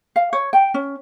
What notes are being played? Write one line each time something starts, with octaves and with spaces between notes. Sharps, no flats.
F5
C#5
G5
C#4